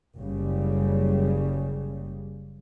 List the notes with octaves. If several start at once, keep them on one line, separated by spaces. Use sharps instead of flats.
F#1 C#3 G3